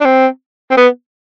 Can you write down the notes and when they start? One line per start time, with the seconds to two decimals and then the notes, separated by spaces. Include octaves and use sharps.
0.01 D4
0.05 C4
0.71 C4
0.77 B3